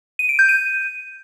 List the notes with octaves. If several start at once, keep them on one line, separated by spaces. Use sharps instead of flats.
D#7
D7
G6
D#7